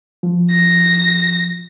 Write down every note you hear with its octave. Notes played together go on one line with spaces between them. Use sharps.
F3
A#6